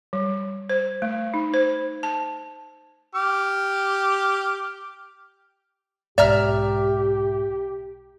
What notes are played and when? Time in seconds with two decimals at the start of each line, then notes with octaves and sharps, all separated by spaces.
0.13 G3
0.70 C5
1.02 A3
1.34 D#4
1.54 C5
2.03 A5
3.15 G4 D6 F6
6.18 B1 G#2 G4 D5 E5 A#5 F6